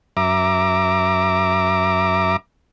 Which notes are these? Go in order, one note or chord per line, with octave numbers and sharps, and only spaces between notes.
F#2 E5 A#5 D6